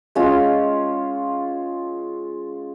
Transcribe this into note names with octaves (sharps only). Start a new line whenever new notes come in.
G#3 C#4 F4